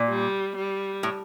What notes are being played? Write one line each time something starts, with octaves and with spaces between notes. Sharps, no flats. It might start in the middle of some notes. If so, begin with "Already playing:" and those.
Already playing: A#2
G3
G3
A2